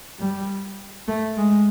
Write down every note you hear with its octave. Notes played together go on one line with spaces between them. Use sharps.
G3
A3
G#3